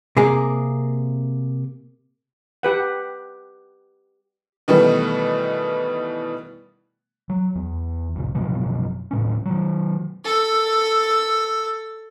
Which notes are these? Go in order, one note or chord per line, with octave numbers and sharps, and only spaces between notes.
C3 A#3 G#4
G4 B4 F#5
B2 D#3 E3 G3 A3 B3
F#3
E2
F1 C2
F#1 B2 F3 F#3
D#1 A2 C#4
D#3 F#3
A4 E6